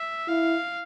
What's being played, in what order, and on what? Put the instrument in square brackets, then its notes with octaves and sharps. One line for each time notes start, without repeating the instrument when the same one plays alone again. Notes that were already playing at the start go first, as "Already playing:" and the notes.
Already playing: [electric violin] E5
[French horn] E4 [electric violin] F5